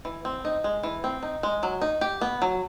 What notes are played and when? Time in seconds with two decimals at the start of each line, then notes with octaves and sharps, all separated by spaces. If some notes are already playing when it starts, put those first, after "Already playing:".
0.05 E3
0.25 C4
0.45 D#4
0.64 G#3
0.83 E3
1.04 C4
1.23 D#4
1.43 G#3
1.63 F#3
1.81 D#4
2.01 G4
2.21 B3
2.42 F#3